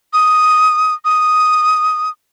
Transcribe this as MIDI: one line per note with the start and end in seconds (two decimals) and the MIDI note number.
0.13 0.94 87
1.05 2.10 87